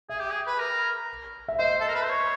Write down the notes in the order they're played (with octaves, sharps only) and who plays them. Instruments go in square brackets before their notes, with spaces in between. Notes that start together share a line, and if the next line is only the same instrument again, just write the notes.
[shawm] G#4 [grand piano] E5
[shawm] G4
G#4
B4
A#4
[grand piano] E5
[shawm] C5 [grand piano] D#5
[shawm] A4
A#4
B4
C5
C#5